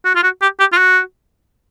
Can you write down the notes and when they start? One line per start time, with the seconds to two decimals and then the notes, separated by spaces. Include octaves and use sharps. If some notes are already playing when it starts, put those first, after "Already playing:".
0.05 F#4
0.15 F4
0.23 F#4
0.42 G4
0.59 G4
0.72 F4
0.77 F#4